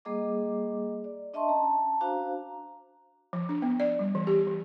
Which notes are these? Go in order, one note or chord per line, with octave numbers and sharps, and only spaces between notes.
G3 A#3 G#4 D#5 D6
D5
D4 D#5 E5 A5 C6 C#6
C#4 A5 A#5
D4 F#4 C5 F5 A#5
F3
D4
B3
D5
G3
E3
G4
E3